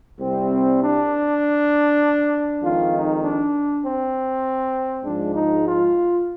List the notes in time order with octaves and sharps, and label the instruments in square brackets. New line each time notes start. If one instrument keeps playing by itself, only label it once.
[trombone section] C2 C3 G3 C4
D4
F2 D#3 G#3 F4
D#4
D4
C4
G#2 F3 G#3 D4
D#4
F4